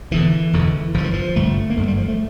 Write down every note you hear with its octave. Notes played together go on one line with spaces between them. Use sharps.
E1 E2 D3 E3
E1 E2 D3
G1 G2 D3 F3
E3
F3
G1 G2 D3 A3
A#3
G1 G2 D3 A3
G3
F3
A3